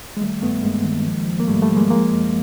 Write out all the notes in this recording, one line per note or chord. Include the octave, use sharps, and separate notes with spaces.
G#3
D#3 G3 A3
G2 A3 B3
G2 G#3 A#3
D#3
F3
F3
A#3
G#2 G3 A3
G3 A3
F3
G#3 A#3
F3 G#3 A#3
F#2